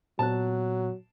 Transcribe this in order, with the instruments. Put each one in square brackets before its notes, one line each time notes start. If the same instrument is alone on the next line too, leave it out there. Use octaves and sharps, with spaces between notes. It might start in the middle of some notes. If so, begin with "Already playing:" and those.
[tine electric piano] A#2 B3 F#6 [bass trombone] F#3 [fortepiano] A5